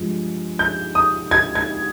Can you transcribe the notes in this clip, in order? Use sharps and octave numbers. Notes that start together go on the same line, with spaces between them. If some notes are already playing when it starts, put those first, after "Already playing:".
Already playing: G2 F3 G#3
G6
D#6
G#6
G#6